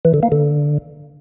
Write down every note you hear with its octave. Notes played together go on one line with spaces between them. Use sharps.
E3
D3
A#3
D3